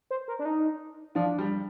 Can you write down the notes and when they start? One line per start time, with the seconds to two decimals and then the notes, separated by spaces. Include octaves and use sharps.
0.11 C5
0.28 A#4
0.39 D4
0.45 D#4
1.15 F3 D4 F4
1.39 G3 G4